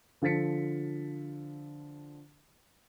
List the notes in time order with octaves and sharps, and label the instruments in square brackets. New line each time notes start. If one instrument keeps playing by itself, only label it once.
[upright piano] D3 F3 A4 A6 B6 C#7